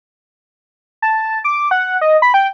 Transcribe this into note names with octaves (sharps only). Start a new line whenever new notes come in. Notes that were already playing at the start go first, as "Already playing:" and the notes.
A5
D6
F#5
D#5
B5
G5